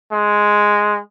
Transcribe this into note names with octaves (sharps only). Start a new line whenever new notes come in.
G#3